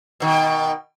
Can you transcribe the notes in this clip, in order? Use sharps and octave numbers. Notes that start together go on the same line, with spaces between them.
B2 D#3